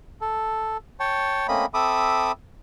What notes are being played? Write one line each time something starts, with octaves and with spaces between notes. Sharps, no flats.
A4
C#5 G5 A5
A3 A#3 C4 C#4 D#5 B5
C4 A4 E5 B5 D6 D#6